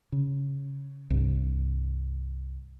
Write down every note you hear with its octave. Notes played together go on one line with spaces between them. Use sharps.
C#3
C2 G2